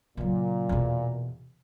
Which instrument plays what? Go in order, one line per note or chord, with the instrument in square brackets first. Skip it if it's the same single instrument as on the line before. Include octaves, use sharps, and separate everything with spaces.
[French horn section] A#2 [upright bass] C#3 F#3
[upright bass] E2 B2